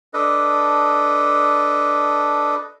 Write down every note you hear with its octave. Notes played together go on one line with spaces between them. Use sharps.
D4 A4 B4 D#5